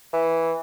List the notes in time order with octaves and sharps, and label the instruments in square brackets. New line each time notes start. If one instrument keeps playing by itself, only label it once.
[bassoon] E3